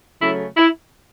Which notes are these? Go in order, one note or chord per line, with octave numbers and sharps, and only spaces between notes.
C#3 F#3 A3 C#4 E4
E4